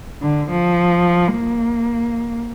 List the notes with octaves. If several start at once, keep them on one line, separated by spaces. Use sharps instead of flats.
D3
F3
A#3